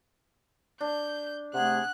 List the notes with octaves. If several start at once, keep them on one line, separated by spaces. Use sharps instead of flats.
D4 G6
C3 A3 G#4 F#5 F#6